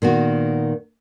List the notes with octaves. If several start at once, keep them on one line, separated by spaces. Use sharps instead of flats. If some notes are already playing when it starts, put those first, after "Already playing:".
A#2 D#3 B3 F#4